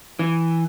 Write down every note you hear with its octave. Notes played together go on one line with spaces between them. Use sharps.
E3